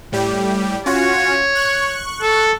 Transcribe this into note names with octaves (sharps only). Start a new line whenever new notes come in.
A2 G3 G4
C#4 F4 F#4 C#5
C#6 F#6
A4